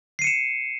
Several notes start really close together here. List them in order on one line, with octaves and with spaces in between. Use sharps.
C7 D#7 C#7 E7